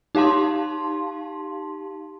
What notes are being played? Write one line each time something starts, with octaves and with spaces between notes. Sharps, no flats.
D#4 G4 F5 A5 C6